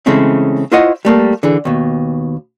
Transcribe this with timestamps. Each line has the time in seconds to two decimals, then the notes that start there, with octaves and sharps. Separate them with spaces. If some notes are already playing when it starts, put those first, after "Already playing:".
0.06 C#3 E3 G#3 A3 C4 C#4
0.72 E4 F4 C5 C#5 D#5 F#5
1.05 G3 A3 A#3
1.43 D3 E3 G#4
1.65 D#2 B2